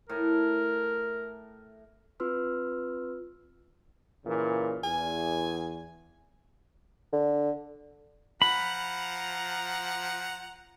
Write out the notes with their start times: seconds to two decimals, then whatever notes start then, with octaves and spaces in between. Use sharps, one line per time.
0.09 A2 A#4
2.20 C4 F4 B4 C6 E6 F6
4.25 A#2 C#3 E3
4.84 E2 G#5
7.13 D3
8.42 F3 F#5 A#5 B5